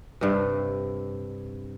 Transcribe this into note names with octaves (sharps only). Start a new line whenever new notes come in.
G2 C3